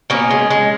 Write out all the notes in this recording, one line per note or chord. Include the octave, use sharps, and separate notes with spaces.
B2 A#3 C#4
G#3
G#3